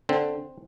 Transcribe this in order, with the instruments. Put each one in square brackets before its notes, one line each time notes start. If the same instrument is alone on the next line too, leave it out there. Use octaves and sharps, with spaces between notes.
[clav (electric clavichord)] D3 C4